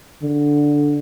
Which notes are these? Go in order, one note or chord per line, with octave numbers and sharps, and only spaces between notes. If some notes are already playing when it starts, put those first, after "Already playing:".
D3